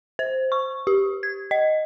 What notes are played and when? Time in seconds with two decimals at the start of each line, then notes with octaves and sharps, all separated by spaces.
0.19 C5
0.52 C#6
0.87 G4
1.23 G#6
1.51 D#5